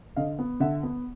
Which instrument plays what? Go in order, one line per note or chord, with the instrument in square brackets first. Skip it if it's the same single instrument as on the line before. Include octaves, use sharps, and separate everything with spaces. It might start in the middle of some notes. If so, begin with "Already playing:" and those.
[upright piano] D3 D#5 F5
B3
D3 E5 F#5
B3